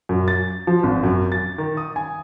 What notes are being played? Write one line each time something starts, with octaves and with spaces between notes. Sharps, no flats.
F#2
A6
F3
G#1
F#2
A6
D#3
D#6
G#5